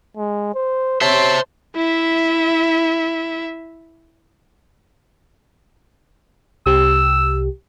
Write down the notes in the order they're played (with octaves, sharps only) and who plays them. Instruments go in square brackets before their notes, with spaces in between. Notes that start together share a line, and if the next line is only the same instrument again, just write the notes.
[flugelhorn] G#3
C5
[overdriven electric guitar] C5 E5 [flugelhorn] C#5 [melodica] A5 C6
[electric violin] E4 E5
[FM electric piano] C2 C3 G4 [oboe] E6